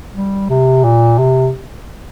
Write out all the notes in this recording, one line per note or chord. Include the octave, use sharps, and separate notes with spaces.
G3
C3
A#2
C3